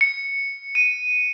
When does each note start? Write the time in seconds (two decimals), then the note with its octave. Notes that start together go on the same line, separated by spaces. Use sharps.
0.01 C#7
0.75 D#7